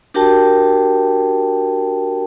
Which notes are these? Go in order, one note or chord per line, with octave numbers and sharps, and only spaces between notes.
D4 F#4 G4 A#4 G5 A5